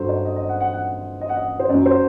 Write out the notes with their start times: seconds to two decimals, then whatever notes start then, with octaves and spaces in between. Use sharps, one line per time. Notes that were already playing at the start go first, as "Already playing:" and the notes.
Already playing: G2 F#3 A4 C5
0.09 D5
0.25 D#5
0.36 D#5
0.49 F#5
0.61 F#5
0.73 F#5
1.21 D#5
1.29 F#5
1.36 D#5
1.60 C5
1.69 F#2 F#3 D5
1.86 C5